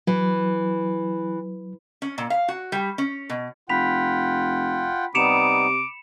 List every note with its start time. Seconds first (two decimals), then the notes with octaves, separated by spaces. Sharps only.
0.07 E3 F#3
2.02 C#4
2.18 A#2
2.30 F5
2.48 F#4
2.72 G3
2.98 C#4
3.30 B2
3.69 F1 F4 F#5 G5 B5 B6 F7
5.15 C3 G3 B3 D#4 D6 C#7 E7 F7